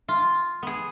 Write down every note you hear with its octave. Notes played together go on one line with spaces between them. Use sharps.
F4
B3 G#4